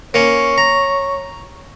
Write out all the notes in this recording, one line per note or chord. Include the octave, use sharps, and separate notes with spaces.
A#3 C#4 C#5
A#5